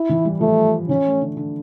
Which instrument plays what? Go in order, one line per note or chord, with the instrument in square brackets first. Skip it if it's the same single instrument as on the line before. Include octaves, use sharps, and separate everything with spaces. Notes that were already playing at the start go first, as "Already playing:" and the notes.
Already playing: [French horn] E4
[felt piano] E3
G3
[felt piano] F3 [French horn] A3
[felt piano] E3 [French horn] C#4
[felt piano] A3
D3
D3